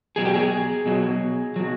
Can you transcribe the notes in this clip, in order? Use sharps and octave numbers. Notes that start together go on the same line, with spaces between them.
B2 F#3 G#4
G4
G#4
B2 F#3
B2 F#3